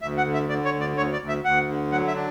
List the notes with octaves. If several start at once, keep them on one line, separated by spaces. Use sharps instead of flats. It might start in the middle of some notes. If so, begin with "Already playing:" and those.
D2 E5
F#5
D3
E5
D3 D5
C#5
D2
D5
D2 C#5
D5
D2
E5
D2 F#5
D3
F#3 F#5
E5
D4